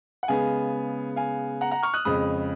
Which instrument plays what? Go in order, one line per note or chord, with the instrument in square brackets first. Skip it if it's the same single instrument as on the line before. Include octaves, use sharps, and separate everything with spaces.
[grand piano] F#5
C#3 G#3 B3 F5 G#5
F5 G#5
F#5 A#5
F#5 A#5
C#6 F6
D#6 F#6
F2 C#3 G#3 B5 D#6